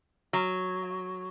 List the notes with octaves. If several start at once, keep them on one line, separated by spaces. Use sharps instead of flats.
F#3